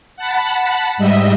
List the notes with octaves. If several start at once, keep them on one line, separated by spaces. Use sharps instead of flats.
F#5 A5 B5
G#2 G3 D#5 E5